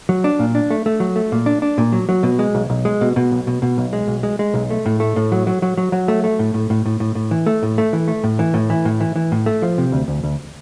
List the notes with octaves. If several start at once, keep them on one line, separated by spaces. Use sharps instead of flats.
F#3
D4
A#2
D4
A3
A3
F#3
A3
A#2
D4
D4
A#2
F#3
F#3
B2
G#3
B1
B1
G#3
B2
B2
B1
B2
B2
B1
G#3
B1
G#3
G#3
B1
A3
A2
A3
A2
F#3
F#3
F#3
F#3
F#3
A3
A3
A2
A2
A2
A2
A2
A2
E3
A3
A2
A3
E3
A3
A2
E3
A2
E3
A2
E3
E3
A2
A3
F3
C3
D2
D2
D2